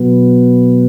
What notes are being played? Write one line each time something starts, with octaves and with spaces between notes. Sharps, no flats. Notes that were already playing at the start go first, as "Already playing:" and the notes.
Already playing: B2 F#3 B3